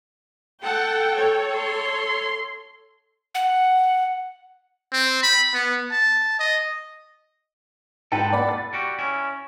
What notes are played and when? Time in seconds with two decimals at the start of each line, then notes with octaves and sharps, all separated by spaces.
0.63 A4 F#5 G5 A5
1.15 A4 C#5
1.57 C6
3.35 F#5
4.93 C4
5.23 B5
5.54 B3
5.92 A5
6.39 D#5
8.12 G#2 A4 B4 G5 A5
8.33 D5 F#5 B5
8.49 A6
8.73 G3 F#4 G4
8.99 C#4 E4